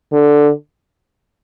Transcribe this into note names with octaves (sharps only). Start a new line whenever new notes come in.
D3